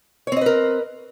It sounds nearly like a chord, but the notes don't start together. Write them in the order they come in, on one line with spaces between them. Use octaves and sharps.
C#5 C4 D#5 B4 A#4